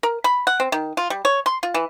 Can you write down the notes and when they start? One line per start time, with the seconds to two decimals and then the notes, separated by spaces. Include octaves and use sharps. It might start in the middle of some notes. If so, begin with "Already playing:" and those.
0.03 A#4
0.24 B5
0.47 F#5
0.60 C4
0.72 D#3
0.97 F4
1.10 G3
1.25 C#5
1.46 C6
1.63 F4
1.74 E3